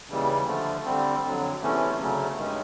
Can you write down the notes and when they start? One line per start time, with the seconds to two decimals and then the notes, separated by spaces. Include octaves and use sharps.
0.10 D#2 C#3 E3 G3
0.47 D3 F3 A3
0.85 D3 G3 C4
1.23 F2 D3 F#3
1.61 E2 C3 E3 A3 C#4
1.99 D2 C#3 F#3 A3
2.36 G2 D#3 G#3 C#4